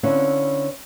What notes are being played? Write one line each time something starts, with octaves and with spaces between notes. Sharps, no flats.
D3 C4 C#4 E4 B4 F5